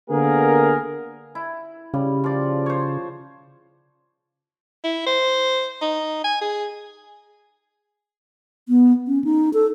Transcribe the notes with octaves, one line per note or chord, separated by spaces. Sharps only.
D3 A#3 B3 G#4 A#4
E4
C#3 G3
F3 D5
C5 C#5
E4
C5
D#4
G#5
G#4
B3
C#4
D#4
A4